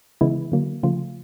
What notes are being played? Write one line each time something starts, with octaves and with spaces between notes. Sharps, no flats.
C#3 E3 G#3 B3 E4
D3 F#3 A#3
C#3 F3 A3 F4